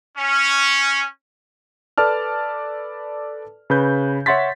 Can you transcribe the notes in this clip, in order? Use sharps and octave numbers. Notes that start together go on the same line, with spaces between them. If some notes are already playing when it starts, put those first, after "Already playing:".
C#4
A4 B4 D5 A5 F6
C#3 B4 G6
C#5 E5 F#5 C6 A6 B6